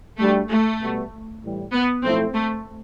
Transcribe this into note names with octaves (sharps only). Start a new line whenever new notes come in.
D2 D3 G3 A3
A3
B2 G3 B3
A2 E3 G3
B3
B1 A2 F3 A3 C4 E4
A3